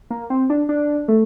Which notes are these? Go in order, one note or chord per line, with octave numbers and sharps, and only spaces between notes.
A#3
C4
D4
D4
A3